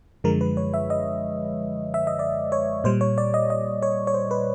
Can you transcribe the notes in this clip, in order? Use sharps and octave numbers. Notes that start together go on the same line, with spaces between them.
F#2 D3 F3 G#3 A#4
B4
C#5
E5
D#5
E5
D#5
D5
C#5
A#2 G3 C5
C#5
D5
D#5
D#5
C#5
C#5
C5
B4